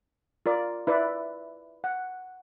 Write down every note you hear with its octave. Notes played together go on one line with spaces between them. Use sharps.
F4 A#4 D5
E4 B4 D5 E5
F#5